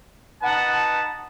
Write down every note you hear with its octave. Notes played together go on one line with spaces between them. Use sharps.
D#4 B4 F#5 A5